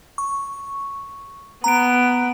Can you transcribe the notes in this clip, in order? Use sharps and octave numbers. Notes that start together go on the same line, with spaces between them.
C#6
B3 A#5 D7